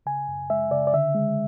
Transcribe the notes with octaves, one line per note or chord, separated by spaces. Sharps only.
C#3 G#5
F#2
G#3 E5
C#3 D5
D5
D3 E5
G#3